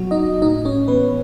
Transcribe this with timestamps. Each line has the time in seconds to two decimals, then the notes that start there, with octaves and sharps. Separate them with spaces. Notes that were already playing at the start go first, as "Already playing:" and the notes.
Already playing: B2 F#3 F#4
0.11 D#4 D#5
0.42 A2 D#4 D#5
0.65 C#4 C#5
0.88 E3 B3 B4